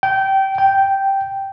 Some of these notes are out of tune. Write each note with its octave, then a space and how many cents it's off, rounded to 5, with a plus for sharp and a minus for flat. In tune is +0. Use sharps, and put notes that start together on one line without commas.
G5 -20
G5 -5